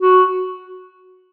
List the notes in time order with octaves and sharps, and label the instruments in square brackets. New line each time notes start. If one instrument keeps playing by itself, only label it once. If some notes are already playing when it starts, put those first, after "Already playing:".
[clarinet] F#4